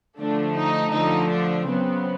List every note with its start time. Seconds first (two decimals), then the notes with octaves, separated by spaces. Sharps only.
0.20 D3 F3 A3 D4
0.57 D#4
0.93 D3 F3 A3 D#4
1.30 D4
1.67 C#3 F#3 B3 C4